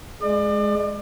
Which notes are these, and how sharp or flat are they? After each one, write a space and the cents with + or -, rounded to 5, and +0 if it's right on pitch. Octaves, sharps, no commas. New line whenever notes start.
G#3 +10 D5 +35